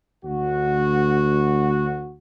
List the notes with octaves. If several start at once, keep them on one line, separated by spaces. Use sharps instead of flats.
D2 F#4